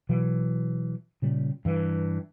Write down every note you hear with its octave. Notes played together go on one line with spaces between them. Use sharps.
B2 E3 F#3
A#2 C#3 G3
G2 E3